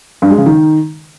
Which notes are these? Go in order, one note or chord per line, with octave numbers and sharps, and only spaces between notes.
G2
G#3
C#3
D#3